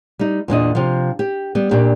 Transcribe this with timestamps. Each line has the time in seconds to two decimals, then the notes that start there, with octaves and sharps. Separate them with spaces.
0.19 G3 D#4
0.48 E2 A#2 D4 D#5
0.75 C3 F3
1.19 G4
1.55 G3 B3
1.71 A#2 D4 G4